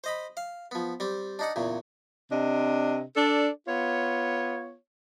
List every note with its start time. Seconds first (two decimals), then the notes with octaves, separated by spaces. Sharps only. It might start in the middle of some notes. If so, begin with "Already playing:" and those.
0.04 C5 D#5 B5
0.37 F5
0.71 F3 B3
1.00 G3 C4
1.39 D4 D#4 F#5
1.56 E2 A#2 C#3
2.31 C3 D4 D#5
3.16 D4 A4 D5
3.68 B3 F4 C#5